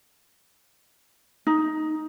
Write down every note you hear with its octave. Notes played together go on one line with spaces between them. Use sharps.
D#4